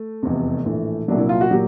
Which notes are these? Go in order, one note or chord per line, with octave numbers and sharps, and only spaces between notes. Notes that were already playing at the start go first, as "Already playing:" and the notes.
Already playing: A3
F1 E2 C3
A#1 A2 E3
C2 A#2 F#3 D4
E4
F4
F#4
A#2 F#3 G4